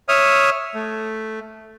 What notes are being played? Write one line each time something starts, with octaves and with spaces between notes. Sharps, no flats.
C#5 E5 D#6 F6
A3